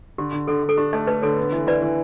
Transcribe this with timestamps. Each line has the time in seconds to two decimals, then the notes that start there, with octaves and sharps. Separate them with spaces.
0.18 D3 G4
0.33 D3
0.48 D3 A4
0.63 D3
0.69 A4
0.77 D4 G4
0.93 A3 A4
1.07 A3 B4
1.22 D3 A4 C#5
1.37 B3
1.52 E3
1.67 E3 B4 D5
1.82 E3